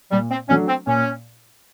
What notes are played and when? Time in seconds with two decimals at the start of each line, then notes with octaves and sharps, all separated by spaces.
0.11 A#2 G3
0.31 C4
0.49 F#3 A3 C#4 D4
0.68 C4
0.87 A#2 C#4